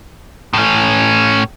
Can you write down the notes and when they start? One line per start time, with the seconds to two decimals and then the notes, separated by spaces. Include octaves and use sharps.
0.53 A2 C#4